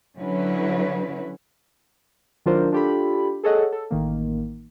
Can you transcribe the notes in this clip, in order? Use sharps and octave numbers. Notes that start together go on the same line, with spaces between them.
D3 F#3 C#4 E4 B4
D#3 F#3 D4 F4 A#4 C5
D4 F4 G4 A4 B5
G#4 A4 C#5 D#5 F#5
A4
A1 D#3 A#3